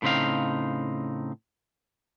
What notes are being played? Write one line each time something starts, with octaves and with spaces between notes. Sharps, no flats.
A2 C#3 C4 D#4 F5